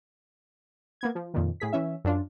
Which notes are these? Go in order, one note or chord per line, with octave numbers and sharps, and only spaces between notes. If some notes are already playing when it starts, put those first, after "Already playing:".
A#3 B3 G#6
F3
F2 A#2 D#3
A2 G#4 B6
E3 C#4 E5
F#2 D4 F4